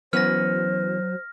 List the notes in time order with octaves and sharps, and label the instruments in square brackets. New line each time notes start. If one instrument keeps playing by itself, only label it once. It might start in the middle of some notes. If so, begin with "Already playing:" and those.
[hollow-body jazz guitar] E3 B3 C#4 [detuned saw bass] F#3 [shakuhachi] C5 [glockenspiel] F6 A#6